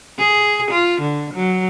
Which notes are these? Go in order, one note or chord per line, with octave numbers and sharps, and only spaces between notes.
G#4
F4
D3
F#3